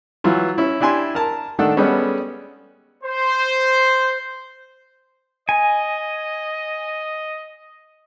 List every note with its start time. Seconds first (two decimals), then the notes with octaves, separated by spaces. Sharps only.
0.24 E3 F#3 F4
0.58 C#4 E4
0.81 D4 E4 G4 G#5 C6
1.15 A#4 A5
1.59 D#3 A3 D4 A4 F#5
1.77 G3 G#3 B3 C#4 A4
3.04 C5
5.49 D#5 G#5